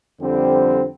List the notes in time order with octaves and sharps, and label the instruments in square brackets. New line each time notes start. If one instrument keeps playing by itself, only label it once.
[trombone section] F2 D3 G3 C4